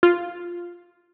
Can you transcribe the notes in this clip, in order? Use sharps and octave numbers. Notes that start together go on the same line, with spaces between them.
F4